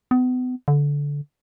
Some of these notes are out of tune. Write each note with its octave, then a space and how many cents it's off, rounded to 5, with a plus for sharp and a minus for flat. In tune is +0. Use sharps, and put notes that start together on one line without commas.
B3 +35
D3 -20